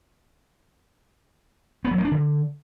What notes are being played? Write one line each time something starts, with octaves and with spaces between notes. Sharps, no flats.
B3
F#3
A#3
D4
D3